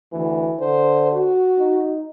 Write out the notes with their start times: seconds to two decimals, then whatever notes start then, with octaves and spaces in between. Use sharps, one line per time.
0.12 D2 E3
0.60 D3 C5
1.12 F#4
1.58 D#4